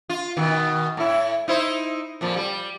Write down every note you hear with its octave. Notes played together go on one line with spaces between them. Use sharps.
F4
B2 D#3
A2 E4
D#4 E4 C5
F2 A#2 F3
G3